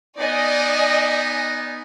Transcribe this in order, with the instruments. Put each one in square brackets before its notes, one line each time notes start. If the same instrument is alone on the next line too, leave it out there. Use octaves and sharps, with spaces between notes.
[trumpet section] B3 D#4 [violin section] D5 D#5 G#5